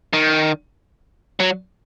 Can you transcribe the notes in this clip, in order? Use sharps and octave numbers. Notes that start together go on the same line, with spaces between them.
D#3
F#3